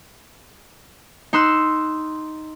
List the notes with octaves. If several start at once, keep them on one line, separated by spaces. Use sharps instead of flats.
D#4 C6 E6 F#6